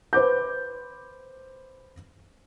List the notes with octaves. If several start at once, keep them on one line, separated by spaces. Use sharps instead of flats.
B4 C5 D6 G6